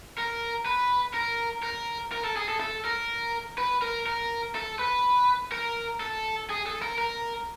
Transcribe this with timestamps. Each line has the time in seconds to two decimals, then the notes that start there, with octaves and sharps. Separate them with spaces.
0.18 A#4
0.66 B4
1.14 A#4
1.63 A#4
2.12 A#4
2.24 A4
2.36 G#4
2.48 A4
2.60 A4
2.85 A#4
3.58 B4
3.82 A#4
4.07 A#4
4.55 A4
4.79 B4
5.52 A#4
6.00 A4
6.50 G#4
6.66 A4
6.82 A#4
6.98 A#4